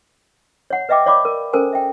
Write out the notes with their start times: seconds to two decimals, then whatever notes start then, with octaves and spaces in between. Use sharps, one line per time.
0.70 C#5 F#5
0.89 B4 D#5 E5 G5 D6
1.06 C#5 D5 F5 B5 D6
1.25 A#4
1.53 C#4 A4 A#4 C5 G#5
1.73 E5 G5